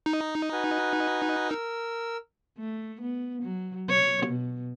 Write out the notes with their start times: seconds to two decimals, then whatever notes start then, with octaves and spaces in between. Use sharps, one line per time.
0.06 D#4
0.52 F#4 B4 G#5
1.49 A#4 E6
2.58 A3
3.01 B3
3.42 F#3
3.89 C#5
4.26 B2